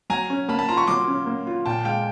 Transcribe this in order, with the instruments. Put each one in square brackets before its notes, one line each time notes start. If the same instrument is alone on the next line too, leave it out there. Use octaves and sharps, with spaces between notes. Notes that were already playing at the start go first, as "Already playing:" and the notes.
[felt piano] F#3 [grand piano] G#5 A#5
[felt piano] C#4
[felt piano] A#3 [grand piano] A5 B5
[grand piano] A5 B5
[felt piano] F4 [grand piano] A#5 C6
[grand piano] B5 C#6
[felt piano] F#3 [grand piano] C6 D6
[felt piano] C#4
A#3
F4
[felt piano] A#2 [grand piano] G5 A5
[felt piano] G#3 [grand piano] F5 G5